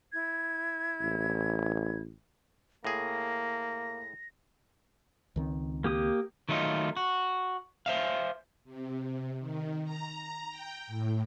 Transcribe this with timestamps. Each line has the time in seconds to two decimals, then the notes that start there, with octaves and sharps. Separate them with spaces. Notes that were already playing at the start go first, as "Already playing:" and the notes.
0.11 E4 G#6
1.01 A1
2.85 A2 A#3 G#4 A#6
5.36 C#2 D#3 C4
5.84 A#3 G4 D#6
6.49 D#3 F#3 A3 D#4 F4
6.97 F#4
7.86 C5 E5 F5
8.64 C3
9.39 D#3
9.84 A#5
10.50 G5
10.87 A2